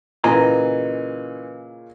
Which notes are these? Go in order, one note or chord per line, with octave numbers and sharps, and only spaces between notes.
A#2 C#3 E3 D#5 G#5 A#5